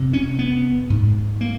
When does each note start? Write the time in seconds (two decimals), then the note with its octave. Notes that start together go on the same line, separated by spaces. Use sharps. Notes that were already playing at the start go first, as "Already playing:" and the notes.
Already playing: F2 C3
0.13 C#4
0.39 B3
0.90 G#2
1.41 A#3